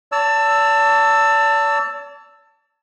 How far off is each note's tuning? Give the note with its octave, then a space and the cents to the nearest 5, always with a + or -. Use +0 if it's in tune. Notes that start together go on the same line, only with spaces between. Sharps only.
D5 -45 A5 +20 E6 +0